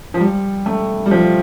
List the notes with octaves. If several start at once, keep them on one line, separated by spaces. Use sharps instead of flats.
F3
G3
A3
G3
F3